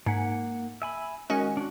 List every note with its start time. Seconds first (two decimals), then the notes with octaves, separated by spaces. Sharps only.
0.06 G#2 A#3 F#5
0.82 E5 G#5 B5
1.30 D#3 G#3 C#4 F#4
1.57 D4 F#4